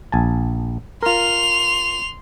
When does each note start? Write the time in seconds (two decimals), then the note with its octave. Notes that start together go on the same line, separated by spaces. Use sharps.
0.12 A#1 G#5 A5
1.03 F4 A#4 C6 F7